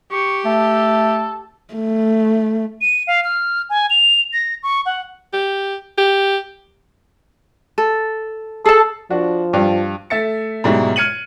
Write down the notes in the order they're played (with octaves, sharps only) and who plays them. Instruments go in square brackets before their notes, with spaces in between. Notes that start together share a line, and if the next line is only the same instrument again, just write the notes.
[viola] G4 [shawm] C#6
[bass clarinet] A3 [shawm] A4
[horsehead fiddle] A3
[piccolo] D#7
F5
F6
G#5
F7
A#6
C#6
F#5
[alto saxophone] G4
G4
[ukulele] A4
[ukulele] G#4 A5 [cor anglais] A4
[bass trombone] F3 [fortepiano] D4 F#4
[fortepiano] G2 F4
[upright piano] A3 E5 A6 C#7
G#2 B2 F#3 G3 E4
F6 G#6 C#7 D#7 F#7